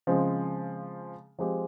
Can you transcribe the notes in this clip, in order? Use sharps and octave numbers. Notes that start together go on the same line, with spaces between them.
C#3 F3 G#3 C4
F3 G#3 C4 G4